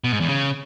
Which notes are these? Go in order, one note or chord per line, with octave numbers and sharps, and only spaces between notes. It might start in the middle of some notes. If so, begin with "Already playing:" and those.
B2
G#2
E2
C#3